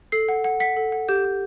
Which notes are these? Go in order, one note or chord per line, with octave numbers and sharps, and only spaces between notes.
A4 C7
F#5
F#5
F#5 B6
A4
F#5
G4 G6
G4